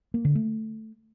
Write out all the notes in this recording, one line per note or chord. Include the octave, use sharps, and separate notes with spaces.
A#3
D3
A3